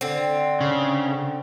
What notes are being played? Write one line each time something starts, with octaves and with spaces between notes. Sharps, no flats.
D3 C4
C#3